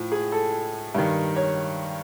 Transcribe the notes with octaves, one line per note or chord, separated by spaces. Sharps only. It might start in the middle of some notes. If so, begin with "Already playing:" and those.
Already playing: A2 F3
G#4
A4
G2 D#3
C#5